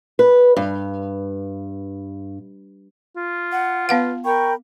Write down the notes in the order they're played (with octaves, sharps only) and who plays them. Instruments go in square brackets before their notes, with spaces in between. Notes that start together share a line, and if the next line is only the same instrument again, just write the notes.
[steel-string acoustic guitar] B4
G2
[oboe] F4
[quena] F#5
[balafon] B3 F5 F#5 [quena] B4
[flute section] A#4 G5 B5 [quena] C#6